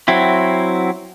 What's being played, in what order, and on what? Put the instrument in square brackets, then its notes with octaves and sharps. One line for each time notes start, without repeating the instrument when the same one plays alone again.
[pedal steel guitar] F#3 C4 E4